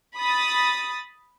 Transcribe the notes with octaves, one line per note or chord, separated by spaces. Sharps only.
B5 D#6 A6